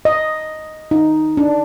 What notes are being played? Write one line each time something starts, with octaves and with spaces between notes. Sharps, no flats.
D#5
D#4
D4